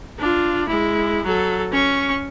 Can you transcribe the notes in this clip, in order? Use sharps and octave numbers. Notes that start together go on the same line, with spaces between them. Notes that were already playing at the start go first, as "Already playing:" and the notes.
D4 F4
G#3 E4
F#3 A4
C#4 C#6